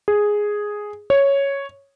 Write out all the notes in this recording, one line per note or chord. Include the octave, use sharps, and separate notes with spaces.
G#4
C#5